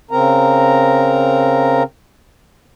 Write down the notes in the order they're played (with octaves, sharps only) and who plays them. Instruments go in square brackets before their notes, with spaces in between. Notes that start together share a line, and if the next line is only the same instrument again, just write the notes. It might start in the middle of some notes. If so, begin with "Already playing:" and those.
[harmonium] C#3 C4 A#4 A#5